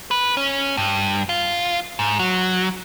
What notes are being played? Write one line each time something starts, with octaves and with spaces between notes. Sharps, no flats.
B4
C#4
G2
F4
G#2
F#3